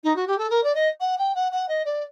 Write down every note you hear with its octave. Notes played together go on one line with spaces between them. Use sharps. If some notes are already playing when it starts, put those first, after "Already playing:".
D#4
F#4
G4
A4
A#4
D5
D#5
F#5
G5
F#5
F#5
D#5
D5